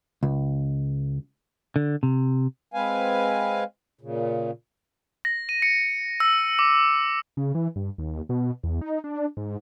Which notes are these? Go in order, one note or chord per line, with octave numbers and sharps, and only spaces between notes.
C#2
D3
C3
G#3 C4 B4 F5 G#5
A#2 C#3
A#6
D#7
C#7
E6
D6
C#3
E3
G2
D#2
B2
E2
D#4
D4
G#2